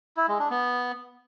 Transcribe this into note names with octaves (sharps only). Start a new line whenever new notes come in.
E4
G#3
D4
B3